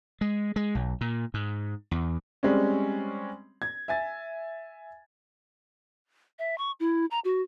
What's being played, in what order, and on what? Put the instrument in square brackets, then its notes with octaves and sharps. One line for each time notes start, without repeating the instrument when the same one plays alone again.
[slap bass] G#3
G#3
B1
A#2
G#2
E2
[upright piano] G3 G#3 C4 C#4
G#6
E5 G#5 A6
[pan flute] E5
C#6
E4
A#5
F#4